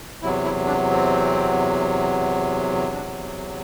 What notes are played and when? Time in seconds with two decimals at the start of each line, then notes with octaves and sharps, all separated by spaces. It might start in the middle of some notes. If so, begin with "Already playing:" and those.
0.22 E2 C3 F#3 E4
0.44 E4
0.67 D4
0.90 C4
2.93 D4